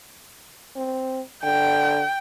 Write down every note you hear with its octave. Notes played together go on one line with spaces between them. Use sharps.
C4
D3 G5